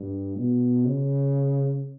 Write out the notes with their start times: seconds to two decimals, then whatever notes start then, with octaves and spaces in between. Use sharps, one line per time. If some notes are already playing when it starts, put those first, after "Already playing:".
Already playing: G2
0.36 B2
0.85 C#3